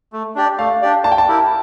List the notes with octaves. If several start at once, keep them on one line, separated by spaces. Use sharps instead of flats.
A3
D4 G4 D5
A3 F5
D4 G4 D5
A#3 A5
G5
A5
E4 G4 A#4